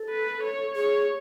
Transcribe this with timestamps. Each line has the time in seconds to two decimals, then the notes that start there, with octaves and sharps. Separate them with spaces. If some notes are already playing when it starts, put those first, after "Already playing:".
Already playing: A4
0.10 B4
0.43 C#5
0.75 G#4 C#5